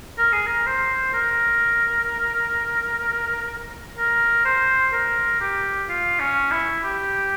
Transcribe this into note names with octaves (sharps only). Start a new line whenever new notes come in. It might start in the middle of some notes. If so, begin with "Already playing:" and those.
A#4
G#4
A#4
C5
A#4
A#4
C5
A#4
G4
F4
C#4
E4
G4